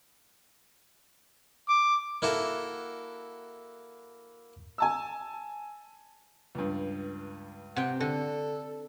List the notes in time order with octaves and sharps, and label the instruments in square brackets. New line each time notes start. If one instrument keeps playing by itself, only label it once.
[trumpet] D6
[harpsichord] A#3 E4 F#4 A4
[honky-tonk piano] G#5 A5 E6
[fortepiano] C#2 G2
[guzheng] C3 G5 [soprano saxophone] F#5
[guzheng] D3 [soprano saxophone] A4